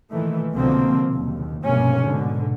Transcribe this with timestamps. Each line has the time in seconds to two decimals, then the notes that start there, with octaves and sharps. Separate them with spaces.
0.11 A#2 D#3 E3 A3
0.54 C2 B2 D3 F3 A#3 C4
1.12 F#1 D#2
1.65 F1 B1 G2 C3 A#3 C#4
2.04 G#2 B2 D3